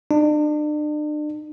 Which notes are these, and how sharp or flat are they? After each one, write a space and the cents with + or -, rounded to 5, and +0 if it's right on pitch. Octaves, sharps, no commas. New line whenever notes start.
D4 +40